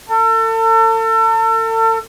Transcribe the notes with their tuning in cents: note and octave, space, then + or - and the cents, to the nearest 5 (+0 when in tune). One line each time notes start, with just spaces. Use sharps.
A4 +40